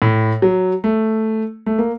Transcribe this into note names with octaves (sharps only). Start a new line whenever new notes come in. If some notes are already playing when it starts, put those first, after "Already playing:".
A2
F#3
A3
A3
A#3